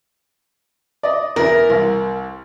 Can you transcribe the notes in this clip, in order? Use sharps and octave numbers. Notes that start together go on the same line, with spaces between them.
D5 D#5
E2 E4 A#4
C2